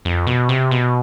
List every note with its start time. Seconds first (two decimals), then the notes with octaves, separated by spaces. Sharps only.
0.05 F2
0.27 B2
0.49 C3
0.71 B2